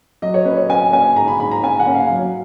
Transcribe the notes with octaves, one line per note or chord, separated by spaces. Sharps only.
F#3 D#5
C#5
C#4 B4
C#5
C#4 G#5
C#4 G#5
G#2 A#5
B5
G#2 B5
A#5
C#4 G#5
F#5
C#4
F5
F#3